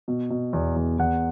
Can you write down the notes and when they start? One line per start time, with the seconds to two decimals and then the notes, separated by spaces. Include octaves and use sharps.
0.08 B2
0.30 B2
0.53 E2
0.76 E2
0.98 E2 F#5